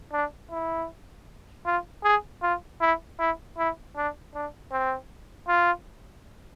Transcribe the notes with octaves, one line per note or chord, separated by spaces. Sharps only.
D4
E4
F4
G#4
F4
E4
E4
E4
D4
D4
C4
F4